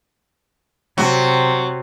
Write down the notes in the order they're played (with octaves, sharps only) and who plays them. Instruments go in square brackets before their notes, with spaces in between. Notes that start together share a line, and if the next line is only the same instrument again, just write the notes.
[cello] C3 [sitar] F#3